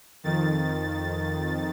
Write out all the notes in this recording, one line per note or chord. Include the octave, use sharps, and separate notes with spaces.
F2 D#3 A6